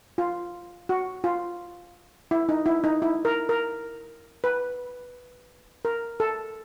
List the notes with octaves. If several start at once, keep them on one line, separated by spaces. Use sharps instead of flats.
F4
F#4
F4
E4
D#4
E4
D#4
E4
A#4
A#4
B4
A#4
A4